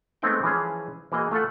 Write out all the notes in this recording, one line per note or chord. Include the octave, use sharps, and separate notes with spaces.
G#3 A3 B3 C4 D#4 G5
E3 F3 C#4 G#4
E3 A#3 F#4 G#4 D#5
A3 F4 A4 F#5